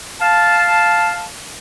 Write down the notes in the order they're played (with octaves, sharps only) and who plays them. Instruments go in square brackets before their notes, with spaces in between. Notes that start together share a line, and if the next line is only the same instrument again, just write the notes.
[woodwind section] F5 A5